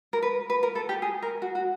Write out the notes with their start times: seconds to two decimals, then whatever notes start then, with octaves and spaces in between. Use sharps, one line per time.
0.13 A#4
0.22 B4
0.50 B4
0.63 A#4
0.75 A4
0.89 G4
1.02 G#4
1.22 A#4
1.42 F#4
1.55 F#4